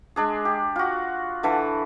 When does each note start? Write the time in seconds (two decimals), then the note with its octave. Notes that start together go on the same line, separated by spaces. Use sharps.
0.16 G#3 D4 G#4
0.45 G4
0.76 F4 F#4
1.43 D3 E3 A4 B4